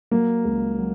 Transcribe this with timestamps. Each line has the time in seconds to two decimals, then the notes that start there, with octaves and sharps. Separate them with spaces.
0.11 F#3 A#3
0.45 C#2
0.78 F#3